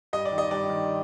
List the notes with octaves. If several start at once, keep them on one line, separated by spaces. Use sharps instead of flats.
G2 D#5
D5
D#3
D#5
G2 D5
D#3